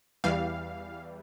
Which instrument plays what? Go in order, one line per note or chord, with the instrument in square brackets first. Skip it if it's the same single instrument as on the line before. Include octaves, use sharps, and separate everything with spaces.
[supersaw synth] E2 E3 G3 F5